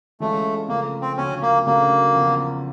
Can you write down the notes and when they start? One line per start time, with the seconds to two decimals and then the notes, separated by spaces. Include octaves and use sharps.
0.20 E3 G#3 A3 C#4 F4
0.68 C#3 F3 A3 A#3
1.01 C4
1.17 D2 C#3 F3 C#4
1.42 A#3
1.66 C#3 F#3 A3 A#3 D4 F#4
2.14 E2 C#3 F3